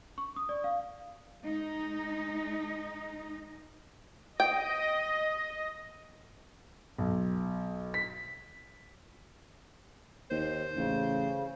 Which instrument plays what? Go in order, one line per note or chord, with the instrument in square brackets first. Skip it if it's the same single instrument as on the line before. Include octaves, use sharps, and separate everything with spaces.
[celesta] C#6
D#6
D5
F5
[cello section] G#3 D#4
[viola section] D#5 [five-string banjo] G5
[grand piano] B1
B6
[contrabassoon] D#2 [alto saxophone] C5
[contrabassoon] A1 [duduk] C#3